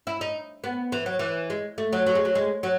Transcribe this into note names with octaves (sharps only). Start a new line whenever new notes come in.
E4
D#4
B3
E3
F#3
E3
G#3
A3
F#3
F#3
G#3
F#3
G#3
F#3